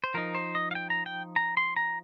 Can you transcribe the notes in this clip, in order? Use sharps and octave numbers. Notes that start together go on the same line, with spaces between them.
C5
F3 D#4 A#4
C5
D#5
F5
G5
A#5
G5
A#5
C6
A#5